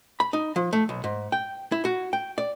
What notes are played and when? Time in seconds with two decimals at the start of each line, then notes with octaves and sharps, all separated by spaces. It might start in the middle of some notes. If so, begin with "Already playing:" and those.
0.20 B5
0.33 D#4
0.56 F3
0.73 A3
0.89 B1
1.04 G#2
1.32 G5
1.72 E4
1.85 F#4
2.13 G5
2.38 D5